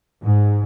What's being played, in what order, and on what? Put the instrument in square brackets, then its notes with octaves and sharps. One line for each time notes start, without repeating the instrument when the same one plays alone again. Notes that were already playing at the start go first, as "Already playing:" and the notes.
[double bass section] G#2